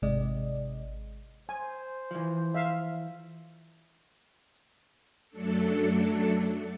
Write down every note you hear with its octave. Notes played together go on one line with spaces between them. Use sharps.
G#1 C3 G#3 D5 D#5
C5 G#5
E3 F3
E5 F5
F#2 F#3 A3 D4 A4 C#7